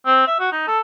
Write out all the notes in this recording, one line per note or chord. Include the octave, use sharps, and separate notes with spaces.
C4
E5
F#4
D#4
A4